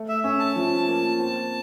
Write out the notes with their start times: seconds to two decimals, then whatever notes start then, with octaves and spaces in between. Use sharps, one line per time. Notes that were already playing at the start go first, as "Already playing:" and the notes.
Already playing: A3
0.08 E5
0.24 C#4 E5
0.39 A5
0.56 F3
0.88 A#3
1.19 C4